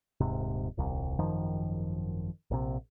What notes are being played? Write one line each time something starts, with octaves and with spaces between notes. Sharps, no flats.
D#1 G#2 C3
D#1 C2
G#1 F#2 D#3 F3
A#1 C3